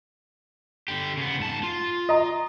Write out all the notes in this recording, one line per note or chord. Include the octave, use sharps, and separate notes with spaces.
D3 G4
C#3 B3
G#2 A5
F4
D#5 A#5